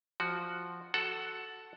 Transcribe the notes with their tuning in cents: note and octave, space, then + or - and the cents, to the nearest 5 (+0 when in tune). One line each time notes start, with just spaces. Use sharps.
F3 +0 F#4 +0
F#4 +0 A4 +0 F#5 +15